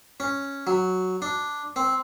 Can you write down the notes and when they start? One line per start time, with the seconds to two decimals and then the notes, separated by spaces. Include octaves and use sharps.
0.20 C#4
0.67 F#3
1.22 D4
1.76 C4